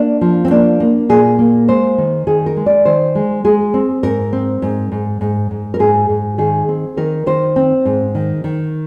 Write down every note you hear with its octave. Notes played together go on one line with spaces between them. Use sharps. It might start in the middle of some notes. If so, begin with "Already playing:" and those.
Already playing: A#3 D4
F3
C4
A#3 D4
A#3
A#2 G#4
A#3
G#3 C5
D#3
D#3 G#4
A#4
G#3
D5
D#3 C5
G#3
G#3 G#4
C4
G#2 A#4
C4
G#2
G#2
G#2
G#2
A#4
G#2 G#4
G#2
D#3 G#4
C4
D#3 A#4
D#3 C5
C4
G#2
D#3
D#3